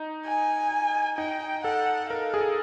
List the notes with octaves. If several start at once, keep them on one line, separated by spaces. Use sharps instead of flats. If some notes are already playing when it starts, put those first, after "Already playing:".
Already playing: D#4
G#5
D#4 G5
A4 F#5
A#4 F5
G#4
A4